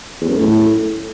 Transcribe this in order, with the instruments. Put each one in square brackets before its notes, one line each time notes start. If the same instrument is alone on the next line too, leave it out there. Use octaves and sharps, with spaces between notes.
[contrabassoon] E2
F#2
A2